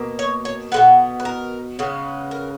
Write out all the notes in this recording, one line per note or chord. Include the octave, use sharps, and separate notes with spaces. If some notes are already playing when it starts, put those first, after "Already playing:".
Already playing: B2 A#3
C#5
C#5
B2 G#3 B3 B4
B4
A#4
C#3 G#3 B3
A#4